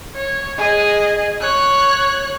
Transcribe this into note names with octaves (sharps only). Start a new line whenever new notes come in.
C#5
G#4 D#5
C#5 F#6